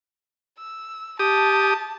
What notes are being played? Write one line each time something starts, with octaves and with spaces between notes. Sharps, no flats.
E6
G4 A5 D#6